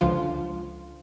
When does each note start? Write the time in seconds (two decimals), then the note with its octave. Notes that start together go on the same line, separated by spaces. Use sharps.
0.01 C#2 D3 F3 F4